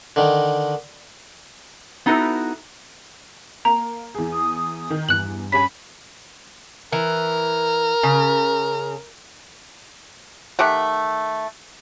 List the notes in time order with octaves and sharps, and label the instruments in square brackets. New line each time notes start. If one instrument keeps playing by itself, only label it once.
[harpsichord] D3 D#3
[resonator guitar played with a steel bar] B3 D#4 E4 F#4 A4 B4
[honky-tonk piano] A#3 [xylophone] A#5
[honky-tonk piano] E2 G#4
[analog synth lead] D#6
[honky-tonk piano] D#3
[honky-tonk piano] E2 [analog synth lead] G2 [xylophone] F#6 F#7
[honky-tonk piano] C#4 G4 G#5 [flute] B5 [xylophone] B6
[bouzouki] E3 [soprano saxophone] A#4
[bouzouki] C#3
[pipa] D#3 A3 G4 F#5